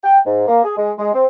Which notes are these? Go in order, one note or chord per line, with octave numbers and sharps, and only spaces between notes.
G5
G#2
A#3
G#4
G#3
G#3
C4